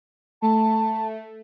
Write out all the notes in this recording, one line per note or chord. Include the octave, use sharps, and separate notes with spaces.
A3 A5